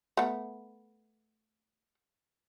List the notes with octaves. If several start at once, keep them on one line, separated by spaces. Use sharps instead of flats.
A3 B3